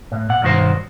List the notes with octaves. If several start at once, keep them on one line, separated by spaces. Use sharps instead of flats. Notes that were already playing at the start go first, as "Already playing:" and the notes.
A2
A#2 F#5
B1 G2 D#3 F#4 C5